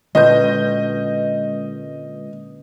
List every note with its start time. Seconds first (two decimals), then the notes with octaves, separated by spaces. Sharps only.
0.15 A#2 D3 G#3 C#4 B4 D#5 G6